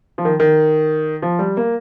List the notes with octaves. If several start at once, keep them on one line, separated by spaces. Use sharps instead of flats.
F3
D#3
D#3
F3
G3
A#3